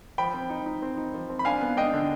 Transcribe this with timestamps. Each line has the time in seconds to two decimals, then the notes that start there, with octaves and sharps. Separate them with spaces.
0.18 F3 G5 B5
0.34 C4
0.50 D#4
0.66 D#4
0.82 C4
0.97 D#4
1.14 F3
1.30 C4
1.39 B5
1.45 D4 F5 G#5
1.61 B3
1.77 D4 D#5 G5
1.93 D3